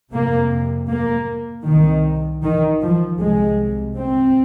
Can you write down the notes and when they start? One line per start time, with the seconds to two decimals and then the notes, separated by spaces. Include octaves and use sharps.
0.12 F2 C3 A#3
0.89 A#3
1.66 C2 C3 D#3
2.43 D#3
2.81 F3
3.19 C2 C3 G#3
3.97 C4